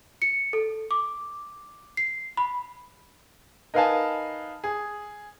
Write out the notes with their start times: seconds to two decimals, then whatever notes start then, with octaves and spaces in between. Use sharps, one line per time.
0.22 C#7
0.53 A4
0.91 D6
1.97 C7
2.37 B5
3.74 D#4 A#4 B4 F5 G#5 A5
4.64 G#4